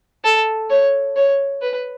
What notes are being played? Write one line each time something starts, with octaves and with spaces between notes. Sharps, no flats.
A4
C#5
C#5
B4